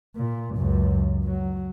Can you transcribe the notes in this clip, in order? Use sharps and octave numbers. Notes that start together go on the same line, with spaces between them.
A#2
C#2 F#2
F#3